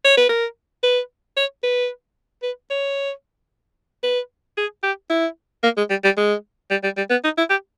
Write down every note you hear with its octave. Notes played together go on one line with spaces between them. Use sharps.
C#5
B4
A#4
B4
C#5
B4
B4
C#5
B4
G#4
G4
E4
A#3
G#3
G3
G3
G#3
G3
G3
G3
B3
D#4
E4
G4